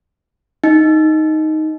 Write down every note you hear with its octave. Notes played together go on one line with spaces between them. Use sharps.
D#4